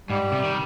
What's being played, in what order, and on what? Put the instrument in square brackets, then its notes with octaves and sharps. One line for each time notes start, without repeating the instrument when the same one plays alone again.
[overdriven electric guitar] G#2 [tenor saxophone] G3
[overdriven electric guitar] C3
D#3